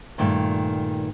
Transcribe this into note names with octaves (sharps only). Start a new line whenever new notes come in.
G2 A#2 D#3 A3